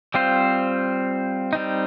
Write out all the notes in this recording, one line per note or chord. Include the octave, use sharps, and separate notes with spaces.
G3 C4 F4 C5
G3 C4 D#4